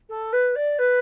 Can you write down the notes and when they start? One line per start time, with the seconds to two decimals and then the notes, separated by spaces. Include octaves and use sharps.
0.09 A4
0.33 B4
0.55 D5
0.79 B4